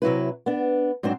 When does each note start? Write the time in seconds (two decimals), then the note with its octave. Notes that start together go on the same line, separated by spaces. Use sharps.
0.02 C3 F#3 E4 B4
0.46 B3 D4
1.03 G#2 F#3 C4 D4 C5